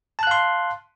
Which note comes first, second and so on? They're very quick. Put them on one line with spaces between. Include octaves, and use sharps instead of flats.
A5 F#6 F5 C6